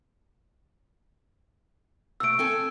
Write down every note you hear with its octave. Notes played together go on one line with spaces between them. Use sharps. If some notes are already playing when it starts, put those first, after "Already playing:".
B2 A3 E6 D7
C4 A4 G#5